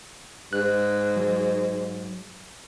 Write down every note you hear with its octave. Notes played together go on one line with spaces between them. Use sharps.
G#2 F#6
F#3